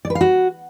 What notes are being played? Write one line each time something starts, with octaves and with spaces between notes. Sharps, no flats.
D5
B4
F5
F#4